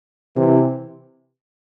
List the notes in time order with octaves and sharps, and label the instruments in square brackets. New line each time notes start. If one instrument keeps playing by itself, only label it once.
[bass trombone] C3 [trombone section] E3